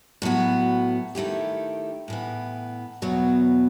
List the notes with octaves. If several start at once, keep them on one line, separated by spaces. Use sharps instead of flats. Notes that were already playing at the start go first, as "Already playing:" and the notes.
A2 F#3 B3 F#4
D#3 A3 E4 G4
A2 E3 B3
E2 B2 F#3 B3